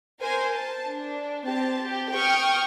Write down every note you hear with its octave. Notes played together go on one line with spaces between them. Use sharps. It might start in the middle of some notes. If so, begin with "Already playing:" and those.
A#4 C5 G#5
A5
D4
C4 G4 A5
G4
G5 C#6 D#6 F6